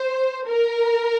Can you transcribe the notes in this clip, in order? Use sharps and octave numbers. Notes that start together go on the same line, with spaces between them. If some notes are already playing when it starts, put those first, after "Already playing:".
Already playing: C5
A#4